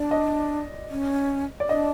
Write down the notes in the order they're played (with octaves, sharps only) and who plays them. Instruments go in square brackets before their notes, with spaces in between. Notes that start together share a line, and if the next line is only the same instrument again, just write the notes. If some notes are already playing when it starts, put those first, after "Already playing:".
Already playing: [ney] D4 [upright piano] D5
[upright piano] D#5
[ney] C#4
[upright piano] D5
[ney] D4 [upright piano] D#5